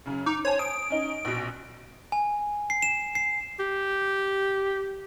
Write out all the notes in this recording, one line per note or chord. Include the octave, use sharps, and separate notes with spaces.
F#2 C#3
D#4 D6
C5 C#5 G#5 A5
D#6 D7
C#4 D#4
A#1 B2
G#5
C7
E7
C7
G4